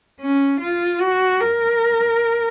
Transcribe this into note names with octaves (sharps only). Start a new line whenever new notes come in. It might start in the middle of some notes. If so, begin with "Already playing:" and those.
C#4
F4
F#4
A#4